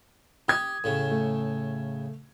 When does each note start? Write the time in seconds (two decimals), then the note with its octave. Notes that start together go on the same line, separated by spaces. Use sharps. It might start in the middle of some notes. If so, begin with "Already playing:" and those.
0.48 G4 D#6 G#6
0.84 A2 C#3
1.11 A3